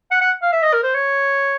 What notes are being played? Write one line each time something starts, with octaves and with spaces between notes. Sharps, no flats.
F#5
F#5
F5
E5
D#5
A#4
C5
C#5